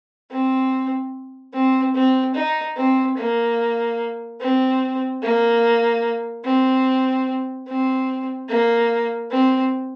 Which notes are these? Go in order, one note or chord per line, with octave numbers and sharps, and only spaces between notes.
C4
C4
C4
D#4
C4
A#3
C4
A#3
C4
C4
A#3
C4